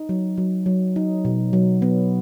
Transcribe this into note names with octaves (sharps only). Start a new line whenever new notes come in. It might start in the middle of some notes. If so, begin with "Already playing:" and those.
Already playing: D#4
F#3
F#3
F#3
D#4
B2
F#3
B3